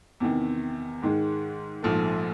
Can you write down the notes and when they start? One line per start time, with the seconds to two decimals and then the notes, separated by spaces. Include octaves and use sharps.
0.20 E2 C3 D#3
1.02 G#2 D#3 G#3
1.83 A#1 G#2 F3 A3